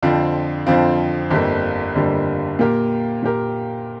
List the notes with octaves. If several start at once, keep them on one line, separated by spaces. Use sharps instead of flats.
F2 D3 F3 C4 F4
F2 D3 F3 C4 F4
G1 F2 D3 G3 A#3
G1 F2 D3 G3 A#3
A#2 A#3 G4 A#4
A#2 A#3 G4 A#4